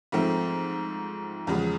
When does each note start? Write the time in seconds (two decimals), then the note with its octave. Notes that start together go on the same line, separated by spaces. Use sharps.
0.12 G#2 F3 A3 C4
1.47 E2 C#3 F3 G#3